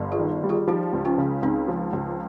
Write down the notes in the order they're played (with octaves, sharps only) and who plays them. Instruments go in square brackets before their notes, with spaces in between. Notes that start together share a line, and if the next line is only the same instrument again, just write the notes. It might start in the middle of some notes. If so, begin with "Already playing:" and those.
Already playing: [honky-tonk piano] G1 G2
[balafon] F4 G#4
[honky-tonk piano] D#3
G3
[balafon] F4 G#4
[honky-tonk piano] F3 [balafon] D#4 G4
[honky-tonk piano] C#2
[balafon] C#4 F4
[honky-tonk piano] C#3
[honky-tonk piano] C#2 [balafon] C4 D#4
[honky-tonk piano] F3
C#2